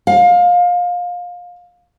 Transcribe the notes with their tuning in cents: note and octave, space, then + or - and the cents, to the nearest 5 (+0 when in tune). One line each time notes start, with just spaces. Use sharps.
F5 +25